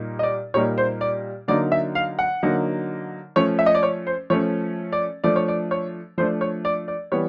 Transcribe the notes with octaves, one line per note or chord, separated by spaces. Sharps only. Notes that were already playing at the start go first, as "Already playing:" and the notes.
Already playing: A#2 G3 A#3 D#4
D#5
D5
A#2 G3 A#3 D#4 C#5
C5
D5
D3 F#3 A#3 D#4 D5
E5
F5
F#5
D3 F#3 A#3 D#4
F3 A3 C#4 C#5
E5
D#5
D5
C#5
C5
F3 A3 C#4 C#5
D5
F3 A3 D4 D5
C#5
D5
C#5
F3 A3 D4 C5
C#5
D5
D5
E3 G3 B3 C#5